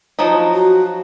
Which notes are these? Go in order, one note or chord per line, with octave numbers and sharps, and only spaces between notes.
F3 F#3 D#4
F#4